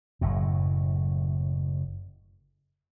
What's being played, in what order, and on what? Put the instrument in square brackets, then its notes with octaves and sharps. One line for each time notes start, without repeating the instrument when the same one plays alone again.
[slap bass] F#1 F#2 A2